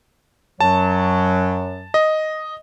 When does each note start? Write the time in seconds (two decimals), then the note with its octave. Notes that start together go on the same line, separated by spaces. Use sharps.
0.60 F#2 F#3 A5
1.94 D#5